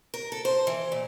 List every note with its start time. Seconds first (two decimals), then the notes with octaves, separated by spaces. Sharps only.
0.14 A#4
0.32 A4
0.45 C5
0.67 E3
0.92 A#2